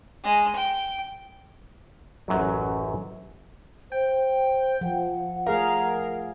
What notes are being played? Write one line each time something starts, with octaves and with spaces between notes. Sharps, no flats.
G#3
G5
A1 F#2 F#3
C5 G5
F3 F#5
A3 G#4 A#4 F5